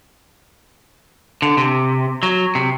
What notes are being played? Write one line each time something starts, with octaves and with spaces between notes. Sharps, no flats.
D3
C3
F#3
C3